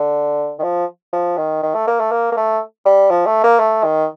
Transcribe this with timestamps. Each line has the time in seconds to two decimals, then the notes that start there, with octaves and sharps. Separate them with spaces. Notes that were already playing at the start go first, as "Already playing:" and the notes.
Already playing: D3
0.59 D#3
0.63 F3
1.13 F3
1.37 D#3
1.63 D#3
1.75 A3
1.87 A#3
2.00 A3
2.11 A#3
2.32 A#3
2.37 A3
2.86 G3
3.10 F3
3.26 A3
3.44 A#3
3.60 A3
3.84 D#3